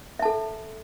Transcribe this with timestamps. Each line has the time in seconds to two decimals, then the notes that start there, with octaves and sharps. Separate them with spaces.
0.19 E5
0.22 A5
0.25 A4